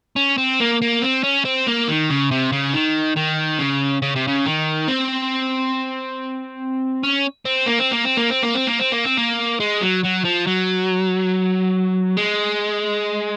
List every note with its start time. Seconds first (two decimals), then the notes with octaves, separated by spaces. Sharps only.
0.16 C#4
0.38 C4
0.60 A#3
0.82 A#3
1.02 C4
1.24 C#4
1.45 C4
1.67 A#3
1.88 D#3
2.10 C#3
2.31 C3
2.52 C#3
2.73 D#3
3.17 D#3
3.59 C#3
4.02 C#3
4.16 C3
4.28 C#3
4.46 D#3
4.88 C4
7.03 C#4
7.45 C4
7.67 A#3
7.80 C4
7.92 A#3
8.05 C4
8.17 A#3
8.30 C4
8.43 A#3
8.55 C4
8.67 A#3
8.79 C4
8.92 A#3
9.05 C4
9.18 A#3
9.60 G#3
9.81 F#3
10.03 F#3
10.24 F3
10.47 F#3
12.17 G#3